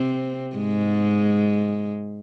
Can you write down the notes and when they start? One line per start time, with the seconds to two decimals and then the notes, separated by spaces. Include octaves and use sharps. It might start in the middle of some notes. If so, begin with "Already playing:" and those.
Already playing: C3 C4
0.56 G#2 G#3